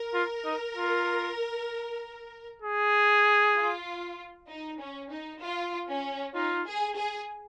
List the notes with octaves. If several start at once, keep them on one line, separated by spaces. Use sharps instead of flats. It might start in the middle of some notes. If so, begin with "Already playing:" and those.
Already playing: A#4
F4
D#4
F4
G#4
F4
D#4
C#4
D#4
F4
C#4
D#4 F4
G#4
G#4